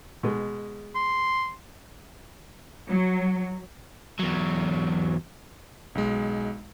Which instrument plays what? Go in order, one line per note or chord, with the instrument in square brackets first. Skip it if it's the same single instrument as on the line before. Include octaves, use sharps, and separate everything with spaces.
[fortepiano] B2 G#3
[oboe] C6
[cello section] F#3
[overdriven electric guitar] E2 F#3
[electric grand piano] B1 G#3